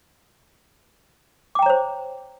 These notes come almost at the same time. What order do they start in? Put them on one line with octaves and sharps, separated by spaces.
D6 G5 A#5 C#5 C5